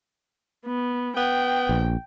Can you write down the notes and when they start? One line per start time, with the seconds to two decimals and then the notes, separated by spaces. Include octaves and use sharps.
0.65 B3
1.17 B3 G5
1.69 A#1